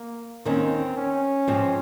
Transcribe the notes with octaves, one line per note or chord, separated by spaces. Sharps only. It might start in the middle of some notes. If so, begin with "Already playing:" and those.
Already playing: A#3
D#2 D#3 A#3 C4 C#4
C#4
G#2 F3 C4 F4